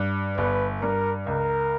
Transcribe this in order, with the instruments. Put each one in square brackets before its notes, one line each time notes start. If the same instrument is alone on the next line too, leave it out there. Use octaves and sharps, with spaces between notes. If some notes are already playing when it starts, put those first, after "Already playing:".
Already playing: [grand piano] G2
[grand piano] G1 [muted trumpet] B4
[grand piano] G2 [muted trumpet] A#4
[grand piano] C#2 [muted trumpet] A#4